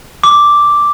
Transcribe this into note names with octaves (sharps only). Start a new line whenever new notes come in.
D6